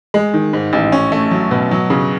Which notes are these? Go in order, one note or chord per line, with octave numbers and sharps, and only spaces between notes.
G#3
D#3
G#2
A1
C#4
A3
F#3
B2
F#3
C#3